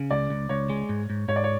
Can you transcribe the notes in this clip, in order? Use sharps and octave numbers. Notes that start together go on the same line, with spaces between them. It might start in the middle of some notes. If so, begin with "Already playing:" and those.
Already playing: C#3
C#2 D5
C#2
C#2 C#5
G#3
G#2
G#2
G#2 C#5
D5
C#5